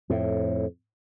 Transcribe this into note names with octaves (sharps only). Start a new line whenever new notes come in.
F2 A2